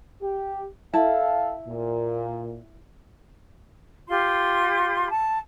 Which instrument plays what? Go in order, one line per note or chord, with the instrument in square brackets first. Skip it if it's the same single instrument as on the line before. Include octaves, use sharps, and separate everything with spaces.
[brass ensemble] G4
[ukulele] E4 A5 [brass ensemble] A4 F5
[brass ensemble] A#2
[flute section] F4 G4 C6
A5